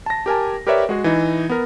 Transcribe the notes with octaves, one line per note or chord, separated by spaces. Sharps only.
A5 A#6
G4 A#4 G#5 A5
G4 A#4 B4 C#5 D5 E5
G#3 F#4 G#4
E3 D#4
B3 A#4